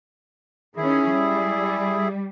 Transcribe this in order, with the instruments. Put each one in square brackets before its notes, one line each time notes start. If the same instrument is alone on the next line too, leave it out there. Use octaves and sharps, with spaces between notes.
[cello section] D#3 C#4 [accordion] E4 G#4
[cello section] G3